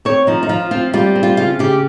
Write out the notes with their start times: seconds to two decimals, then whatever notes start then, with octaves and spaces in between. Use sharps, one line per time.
0.05 C4 C#5
0.27 F3 D#4
0.43 D#4
0.49 F3 F4
0.71 C4 F4
0.93 G3 F4
1.15 C4
1.23 F4
1.37 C#3 F4
1.59 C#3 G4